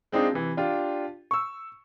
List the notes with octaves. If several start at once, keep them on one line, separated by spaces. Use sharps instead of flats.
G#3 C4 D4 D#4 F4
C3 E3
D4 F4 G4
C#6 E6